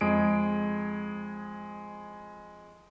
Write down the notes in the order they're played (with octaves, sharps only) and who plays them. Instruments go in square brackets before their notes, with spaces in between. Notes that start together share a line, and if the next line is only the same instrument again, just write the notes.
[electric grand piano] F2 G#3 G#4 D7